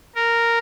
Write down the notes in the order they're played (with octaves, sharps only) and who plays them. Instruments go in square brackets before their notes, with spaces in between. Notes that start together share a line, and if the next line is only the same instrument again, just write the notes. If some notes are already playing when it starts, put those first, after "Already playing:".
[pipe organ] A#4